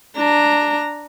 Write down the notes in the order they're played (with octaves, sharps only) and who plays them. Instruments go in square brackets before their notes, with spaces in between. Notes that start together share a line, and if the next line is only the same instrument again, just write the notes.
[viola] D4 A#5